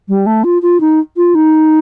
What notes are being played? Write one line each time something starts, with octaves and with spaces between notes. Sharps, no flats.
G3
A3
F4
F4
D#4
F4
D#4